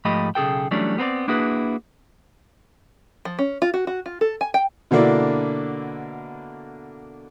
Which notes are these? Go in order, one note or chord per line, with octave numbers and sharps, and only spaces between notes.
G#2 F3 A3 G4 D#5 B5
B1 C#3 G#4 A4 G5
E3 F#3 G3 A3 C#4 D4
B3 C4 A#4 D5
A#3 D4 E4 F#4 G#4 B4
F3
C#4
F4
F#4
F#4
F4
A4
G#5
G5
B2 D3 A#3 D4 E4